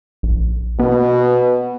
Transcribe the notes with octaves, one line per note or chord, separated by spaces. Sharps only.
A#1
B2 B3